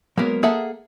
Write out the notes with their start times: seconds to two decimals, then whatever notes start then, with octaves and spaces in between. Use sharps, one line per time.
0.17 F#3 G#3 A#3 B3 A#4
0.43 A#3 G#4 A4 E5 F#5